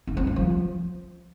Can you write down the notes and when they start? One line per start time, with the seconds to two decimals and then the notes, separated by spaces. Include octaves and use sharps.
0.07 E4
0.17 C4
0.27 F#3
0.36 F3